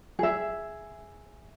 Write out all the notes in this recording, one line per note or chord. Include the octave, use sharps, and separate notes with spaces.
G#4 E5